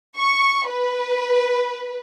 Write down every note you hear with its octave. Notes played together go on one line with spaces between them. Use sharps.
C#6
B4